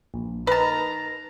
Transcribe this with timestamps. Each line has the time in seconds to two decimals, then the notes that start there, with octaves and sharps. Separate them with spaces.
0.14 A#1
0.47 D#4 A#4 B4 A5 A#5